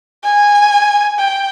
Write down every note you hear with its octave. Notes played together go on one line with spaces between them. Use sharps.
G#5
G5